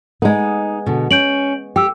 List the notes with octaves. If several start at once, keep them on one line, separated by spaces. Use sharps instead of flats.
G#3 B3 D#4
B2 D3
C#4 G6 D7 F#7
G4 G5 E6